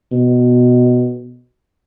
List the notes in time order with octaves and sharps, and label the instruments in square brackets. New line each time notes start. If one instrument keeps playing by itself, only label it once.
[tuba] B2